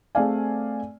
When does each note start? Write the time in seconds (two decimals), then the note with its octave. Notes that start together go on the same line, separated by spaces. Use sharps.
0.15 A3 C4 G#4 D5 F5 G#5